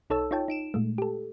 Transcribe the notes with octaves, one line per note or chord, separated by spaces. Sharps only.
B1 D#4 A4 C#5 A5 E6
D#4 F4 C#5 G5 A5
D#4 D7 E7
A#2 G#3 A3
G4 A4